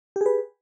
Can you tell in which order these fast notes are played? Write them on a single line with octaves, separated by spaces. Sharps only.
G4 G#4 B4